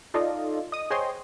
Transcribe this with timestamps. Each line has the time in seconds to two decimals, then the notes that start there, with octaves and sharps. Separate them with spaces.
0.14 D#4 F4 A4 D5 D#5
0.72 D#5 D#6
0.90 G#4 C5 C#5 D#5 G5 C6